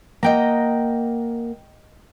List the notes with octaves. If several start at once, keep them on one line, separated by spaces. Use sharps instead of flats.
A#3 D#5 F#5 G5 A#5